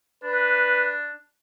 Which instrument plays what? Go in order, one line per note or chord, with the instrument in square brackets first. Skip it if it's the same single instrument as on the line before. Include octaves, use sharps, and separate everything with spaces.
[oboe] D4 [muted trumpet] B4